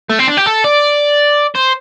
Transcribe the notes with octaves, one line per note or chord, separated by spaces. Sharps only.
A3
C4
D4
G4
A4
D5
C5